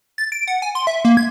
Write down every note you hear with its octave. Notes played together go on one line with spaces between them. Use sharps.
A6
D7
F#5
G#5
C6
E5
A#3
G#6